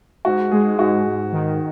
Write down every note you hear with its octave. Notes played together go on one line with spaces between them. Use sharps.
G#2 F#4
G#3 G#4
G#2 F#4
G#2
D#3